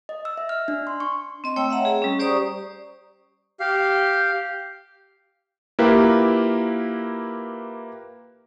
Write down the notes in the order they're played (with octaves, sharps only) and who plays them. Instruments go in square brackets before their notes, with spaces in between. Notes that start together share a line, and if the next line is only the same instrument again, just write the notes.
[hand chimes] D#5
E6
E5
F6
D4
C6
C#6
[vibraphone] C4 D#5
A3 C#5 G5 E6
E5 F#5 A#5
G#4
G3 C#4
G4 C5 D5 A#5 C#6 D#6
[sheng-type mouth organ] G4 F5
[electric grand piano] A#3 E4 F4 G4 A#4 B4